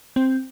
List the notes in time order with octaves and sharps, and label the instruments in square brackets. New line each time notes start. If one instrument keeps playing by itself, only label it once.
[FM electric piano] C4